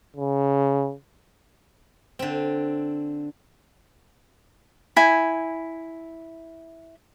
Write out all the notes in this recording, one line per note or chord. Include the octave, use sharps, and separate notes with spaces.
C#3
D3 C4
E4 G#5